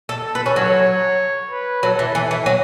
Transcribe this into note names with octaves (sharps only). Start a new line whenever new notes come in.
A4
A4
B4
C#4
F#3 C#5
B4
F#3 A4
E3
E3
E3
F#3